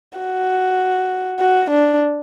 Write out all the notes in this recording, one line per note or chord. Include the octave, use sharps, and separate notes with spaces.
F#4
F#4
D4